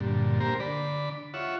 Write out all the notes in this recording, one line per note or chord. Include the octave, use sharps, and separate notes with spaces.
G2 A#2 D3
A#3 G4 A#4 C5
D3 D5 B5
F4 C#5 E5 F#5